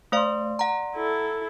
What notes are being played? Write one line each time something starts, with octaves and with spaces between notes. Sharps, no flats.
A3 C5 D5 F5 C6
F#5 A#5
E4 A4